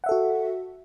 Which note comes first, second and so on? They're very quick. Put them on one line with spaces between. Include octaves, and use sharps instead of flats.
F#5 E5 A4 F#4